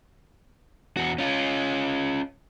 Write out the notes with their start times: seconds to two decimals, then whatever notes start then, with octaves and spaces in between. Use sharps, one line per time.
0.97 E2 F#4
1.18 C#4 F4